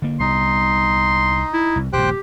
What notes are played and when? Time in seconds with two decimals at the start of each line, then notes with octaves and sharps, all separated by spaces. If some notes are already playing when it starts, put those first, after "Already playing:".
0.02 D3 A#3
0.20 C2 G3 B3 D#4 C6
1.54 E4
1.76 C2
1.93 D#1 A#1 G4 C5 G5 F#6